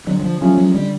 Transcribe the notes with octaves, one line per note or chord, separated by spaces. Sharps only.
D3 F#3
F#3
F3
F3 F#3 A3 C#4
F#3
D3 G3